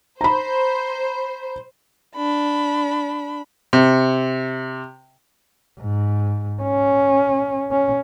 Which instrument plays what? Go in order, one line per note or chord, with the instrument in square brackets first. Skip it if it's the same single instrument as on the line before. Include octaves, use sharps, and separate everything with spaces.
[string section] C5 [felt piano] A#5 B5
[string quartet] D4 B5
[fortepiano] C3
[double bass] G#2
C#4
C#4